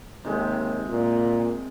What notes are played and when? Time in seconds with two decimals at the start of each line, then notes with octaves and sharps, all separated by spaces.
0.25 D#2 C3 G#3 C4
0.89 A#2